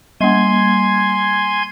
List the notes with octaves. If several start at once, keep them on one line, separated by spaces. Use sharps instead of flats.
G3 A#3 G#5 C6 G#6